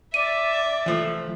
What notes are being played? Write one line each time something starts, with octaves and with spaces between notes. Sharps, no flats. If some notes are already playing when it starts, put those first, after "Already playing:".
D5 E5 D6 D#7
E3 F3 A3